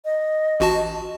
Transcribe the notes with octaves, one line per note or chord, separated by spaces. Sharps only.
D#5
A1 F#4 A5